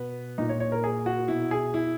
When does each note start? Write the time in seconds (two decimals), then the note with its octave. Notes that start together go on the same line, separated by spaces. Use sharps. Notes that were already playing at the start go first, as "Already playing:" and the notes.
Already playing: B2 B3
0.38 A#2 D#4
0.49 C#5
0.60 C#5
0.72 A#4
0.84 G#4
1.06 F#4
1.28 B2 E4
1.51 G#4
1.74 E4